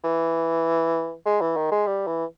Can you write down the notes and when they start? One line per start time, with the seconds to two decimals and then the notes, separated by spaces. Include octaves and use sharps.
0.04 E3
1.26 G#3
1.41 E3
1.56 D#3
1.71 G#3
1.87 G3
2.07 E3